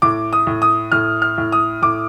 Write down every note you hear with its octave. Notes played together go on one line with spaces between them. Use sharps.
A2 D6
D#6
A2
D#6
A2 F6
F6
A2
D#6
A2 D6